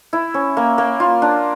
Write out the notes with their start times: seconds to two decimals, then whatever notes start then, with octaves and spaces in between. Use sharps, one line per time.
0.13 E4
0.34 C#4
0.57 A#3
0.78 A#3
1.00 F4
1.22 D4